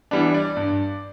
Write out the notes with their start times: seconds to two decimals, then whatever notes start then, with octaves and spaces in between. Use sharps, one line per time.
0.11 E3 G3 B3 D4
0.34 D5
0.57 G2